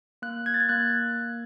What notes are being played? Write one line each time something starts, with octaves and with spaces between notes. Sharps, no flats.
A#3 F#6
G#6
A6
G#6
A#3 F#6